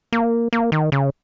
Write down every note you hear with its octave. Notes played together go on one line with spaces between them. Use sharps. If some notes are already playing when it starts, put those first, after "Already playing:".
A#3
A#3
D#3
C#3